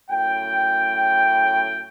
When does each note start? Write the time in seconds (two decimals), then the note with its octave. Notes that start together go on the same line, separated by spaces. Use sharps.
0.10 F#2 A2 G5